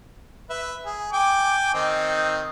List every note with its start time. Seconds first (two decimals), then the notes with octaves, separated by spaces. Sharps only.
0.50 B4 E5
0.86 G#4
1.13 G5 G#5 D6
1.74 D#3 C4 D#4